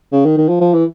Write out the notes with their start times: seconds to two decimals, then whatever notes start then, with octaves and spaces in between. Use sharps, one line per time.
0.12 C#3
0.25 D#3
0.38 D#3
0.49 F3
0.61 F3
0.73 E3